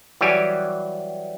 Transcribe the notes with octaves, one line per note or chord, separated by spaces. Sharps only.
E3 F#3 G3 G4 G#5